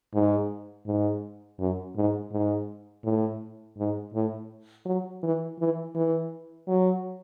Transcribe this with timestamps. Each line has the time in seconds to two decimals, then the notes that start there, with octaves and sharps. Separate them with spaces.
0.14 G#2
0.86 G#2
1.59 F#2
1.96 G#2
2.32 G#2
3.04 A2
3.78 G#2
4.14 A2
4.86 F#3
5.23 E3
5.59 E3
5.95 E3
6.68 F#3